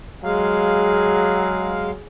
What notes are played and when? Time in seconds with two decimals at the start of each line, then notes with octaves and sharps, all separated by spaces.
0.24 F#3 G#3 G#4 F5